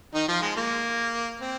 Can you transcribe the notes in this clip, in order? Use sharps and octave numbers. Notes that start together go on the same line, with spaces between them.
D#3 D#4
F3 F4
G#3
A#3
C4